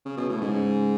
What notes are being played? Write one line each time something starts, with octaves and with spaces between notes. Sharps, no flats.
C#3
B2
A2
G#2 C#3